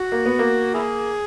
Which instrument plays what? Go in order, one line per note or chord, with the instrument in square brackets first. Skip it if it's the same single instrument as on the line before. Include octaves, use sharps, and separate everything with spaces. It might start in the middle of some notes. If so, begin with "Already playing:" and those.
Already playing: [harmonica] F#4
[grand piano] A#3
B3
A#3
[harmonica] E4 G#4